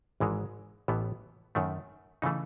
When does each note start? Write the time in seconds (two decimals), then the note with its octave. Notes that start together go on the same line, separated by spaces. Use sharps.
0.20 G#1 G#2 E3 G#3
0.88 A1 A2 E3 B3
1.55 F#2 D#3 A3
2.22 C#3 E3 A3 D#4